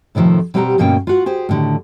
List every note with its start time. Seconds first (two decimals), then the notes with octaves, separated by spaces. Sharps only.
0.15 A2 C3 D#3 F3 A3
0.54 B2 G3 C4 G4 F#5 A#5
0.78 D2 G2 B2 A#3 C#4 G5
1.07 F4 F#4 F#5
1.26 G4 G#4 C5
1.49 A2 D3 D#3